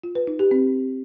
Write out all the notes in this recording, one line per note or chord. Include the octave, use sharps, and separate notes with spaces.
F4
B4
D#4
G4
C4